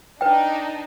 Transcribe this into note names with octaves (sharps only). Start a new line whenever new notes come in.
D4 D#4 B4 G5